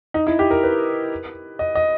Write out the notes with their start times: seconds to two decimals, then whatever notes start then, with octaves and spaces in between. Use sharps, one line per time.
0.14 D#4
0.27 E4
0.39 G4
0.51 A#4
0.63 B4
1.59 D#5
1.75 D#5